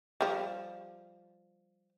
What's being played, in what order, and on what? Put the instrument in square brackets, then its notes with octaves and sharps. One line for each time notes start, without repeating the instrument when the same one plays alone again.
[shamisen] F3 G3